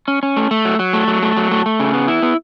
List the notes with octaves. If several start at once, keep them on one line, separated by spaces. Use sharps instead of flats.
C#4
C#4
A3
A3
F#3
F#3
A3
F#3
A3
F#3
A3
A3
C#3
B3
E4
B3